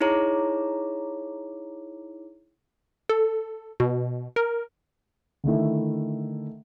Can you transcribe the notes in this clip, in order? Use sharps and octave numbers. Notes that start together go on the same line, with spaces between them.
D#4 E4 G#4 C#5 A#5 D6
A4
B2
A#4
D3 D#3 A3 E4